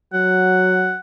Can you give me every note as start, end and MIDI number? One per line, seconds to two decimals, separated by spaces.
0.13 0.96 54
0.13 1.00 78